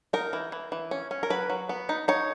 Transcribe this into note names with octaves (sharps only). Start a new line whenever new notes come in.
D#4 A#4
E3
E3
E3
C#4
C#4
A#4
F#3 B4
F#3
B3
D#4
D#4 C#5